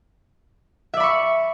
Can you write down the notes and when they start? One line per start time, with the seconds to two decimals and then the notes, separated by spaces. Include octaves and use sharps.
0.94 E5
0.97 D5
1.00 B5
1.03 C#6